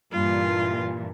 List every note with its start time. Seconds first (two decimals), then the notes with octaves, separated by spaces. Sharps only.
0.12 G2 A#2 E3 F4